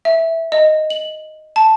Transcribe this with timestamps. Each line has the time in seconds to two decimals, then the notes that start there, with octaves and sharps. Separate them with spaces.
0.05 E5
0.52 D#5
0.90 F#7
1.56 A5